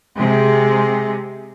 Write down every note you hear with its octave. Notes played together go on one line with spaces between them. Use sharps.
C3 G#3 G#4